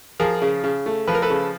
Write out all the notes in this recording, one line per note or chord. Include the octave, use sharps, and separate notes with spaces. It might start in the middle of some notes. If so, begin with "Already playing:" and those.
F3 G#4 A#4
C#3
C#3
A3
F3 B4
A#4
A4 B4
C#3